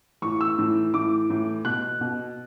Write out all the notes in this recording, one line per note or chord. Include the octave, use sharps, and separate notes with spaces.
A2 E3 C#6
E6
A2 E3
A2 E3 D6
A2 E3
B2 F#6
B2